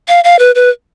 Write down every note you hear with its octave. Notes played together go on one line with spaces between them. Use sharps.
F5
F5
B4
B4